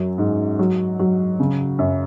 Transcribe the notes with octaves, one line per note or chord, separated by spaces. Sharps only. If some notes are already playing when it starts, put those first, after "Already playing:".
Already playing: F#2 F#3
G#2
F#3
F#3
C#3
F#2